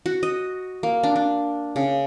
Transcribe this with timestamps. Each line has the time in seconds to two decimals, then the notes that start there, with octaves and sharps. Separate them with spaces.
0.06 F#4
0.23 D#5
0.83 A#3
1.03 D4
1.16 D4
1.76 C#3